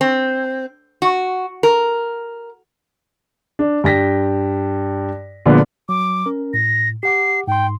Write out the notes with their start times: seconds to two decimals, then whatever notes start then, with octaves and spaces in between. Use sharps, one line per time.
0.01 C4
1.02 F#4
1.63 A#4
3.59 D4
3.84 G2 G5 A#6 B6
5.46 A#2 D3 F3 G#3 A#3 B3
5.89 F#3 D6
6.26 C#4 A#4
6.54 A2 A#6
7.03 G4 F#5 D6 C7
7.47 G#2 G5 C6